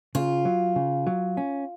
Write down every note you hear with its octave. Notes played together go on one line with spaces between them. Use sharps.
C#3 F4
F#3
C#3
F#3
C#4